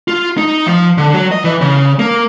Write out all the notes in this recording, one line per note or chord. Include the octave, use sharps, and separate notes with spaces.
F4
D#4
F3
D3
F#3
D#5
E3
C#3
A#3